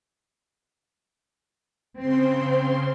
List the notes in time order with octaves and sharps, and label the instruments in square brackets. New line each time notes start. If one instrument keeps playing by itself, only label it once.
[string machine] C#3 C6 [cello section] C4